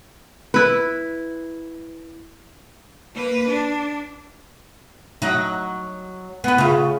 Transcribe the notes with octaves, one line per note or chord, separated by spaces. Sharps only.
E4 B4
A#3 B4
D4
F#3 D#4
B3 B4
C#3 F4